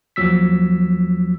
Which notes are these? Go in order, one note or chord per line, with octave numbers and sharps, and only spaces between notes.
D#2 F3 F#3 E6 B6